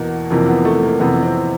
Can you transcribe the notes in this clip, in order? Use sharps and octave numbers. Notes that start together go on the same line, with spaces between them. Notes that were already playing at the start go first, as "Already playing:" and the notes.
Already playing: E2 B2 A#3
F2 C3 E3 A#3
B3
A3
A#3
F2 C3 E3 B3
C4